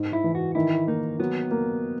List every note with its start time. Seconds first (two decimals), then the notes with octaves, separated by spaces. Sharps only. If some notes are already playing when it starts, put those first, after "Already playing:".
Already playing: G#2
0.13 E4
0.24 E3
0.35 F#4
0.55 D#3 E4
0.87 A#3 D#4
1.19 F#3 B3
1.51 A#3